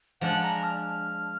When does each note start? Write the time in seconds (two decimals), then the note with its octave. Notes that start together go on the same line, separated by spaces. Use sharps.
0.21 F3 G#3 D4 F#5
0.43 A#5
0.63 F6